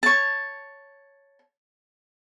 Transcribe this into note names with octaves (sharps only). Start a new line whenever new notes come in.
C#5 A5